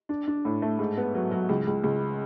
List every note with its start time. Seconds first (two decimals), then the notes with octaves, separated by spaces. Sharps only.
0.09 D4
0.27 D4
0.45 A2
0.62 A3
0.79 G#2
0.97 B3
1.15 F#3
1.31 F#3
1.49 C#2
1.67 C#2
1.84 C#2